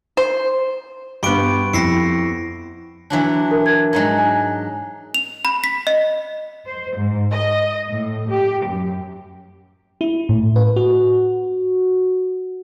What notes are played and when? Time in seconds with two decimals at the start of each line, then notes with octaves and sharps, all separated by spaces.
0.17 C5
1.23 G2 B3 G4 C6 C#6 D7
1.73 F2 E4 A#6 C7 C#7
3.10 E3 F#3 D4
3.51 A#4
3.66 G#6
3.93 G#2 F#3 G#3
4.18 G#5
5.14 F7
5.45 B5
5.64 B6
5.87 D#5
6.66 C5
6.95 G#2
7.30 D#5
7.88 A2
8.29 G4
8.66 F#2
10.01 E4
10.29 A2
10.56 B4
10.76 F#4